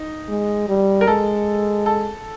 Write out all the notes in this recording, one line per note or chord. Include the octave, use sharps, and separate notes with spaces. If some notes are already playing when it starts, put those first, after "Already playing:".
Already playing: D#4
G#3
G3
A#4
G#3 A4
A4